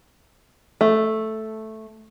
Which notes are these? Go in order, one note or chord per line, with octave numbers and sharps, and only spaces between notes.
A3